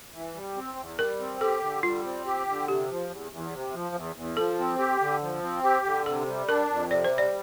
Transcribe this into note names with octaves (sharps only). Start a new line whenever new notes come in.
E3
G3
C4
E2
G3 A#4
C4
G4 A4
D3
G3 F4
C4
G4
D3
C3 G4
F3
E2
E2
C3
F3
E2
E2
F3 A4
C4
G4
D3
F3
C4
G4
D3
C3 A4
G3
D4 A#4
F2
C3 D5
C5
G3
D5